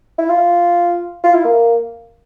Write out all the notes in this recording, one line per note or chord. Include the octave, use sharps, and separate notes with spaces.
E4
F4
F4
E4
A#3